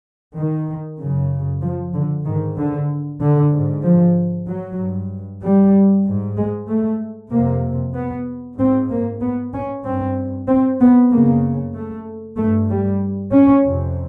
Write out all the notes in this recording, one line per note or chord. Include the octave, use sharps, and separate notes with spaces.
D#3
F#2 C#3
F3
D3
G#2 D#3
D3
D3
G#2
F3
F#3
G2
G3
G#2
G#3
A3
F2 C3 A#3
B3
G#2 C4
A#3
B3
C#4
G2 C4
C4
B3
F#2 C#3 A#3
A3
G2 A3
G3
C#4
F2 C3